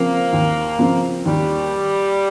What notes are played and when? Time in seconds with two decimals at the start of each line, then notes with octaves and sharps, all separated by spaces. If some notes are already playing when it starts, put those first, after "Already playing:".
Already playing: C#3 F3 A#3 C4
0.33 D#2
0.79 C#3 F3 C4
1.25 D#2 G3